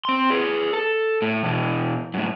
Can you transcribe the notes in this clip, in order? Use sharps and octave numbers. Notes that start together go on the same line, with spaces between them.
C4 C6
G#4 B4
A4
A2
B2 E3
F#2 A2